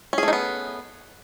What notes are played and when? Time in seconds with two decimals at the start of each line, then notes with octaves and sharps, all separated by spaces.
0.13 C#4
0.18 G#4
0.23 A3
0.28 D#4
0.33 B3